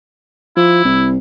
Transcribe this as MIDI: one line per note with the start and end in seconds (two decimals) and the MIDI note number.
0.56 0.85 53
0.56 1.08 64
0.85 1.18 36